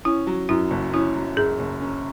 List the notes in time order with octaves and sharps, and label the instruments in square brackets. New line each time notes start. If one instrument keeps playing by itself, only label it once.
[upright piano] C#4 [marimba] E4
[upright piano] F#3
[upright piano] F#2 [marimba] E4
[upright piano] F#1
[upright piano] C#4 [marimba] E4
[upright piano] F#3
[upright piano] F#2 [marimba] G#4
[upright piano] F#1
C#4